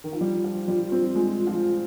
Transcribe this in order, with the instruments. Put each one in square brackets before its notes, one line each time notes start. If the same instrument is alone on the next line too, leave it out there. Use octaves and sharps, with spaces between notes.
[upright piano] D#3
[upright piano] F3 [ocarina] D#4
[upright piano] G3 [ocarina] F4
[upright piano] F3
G3
C4
G#3
F3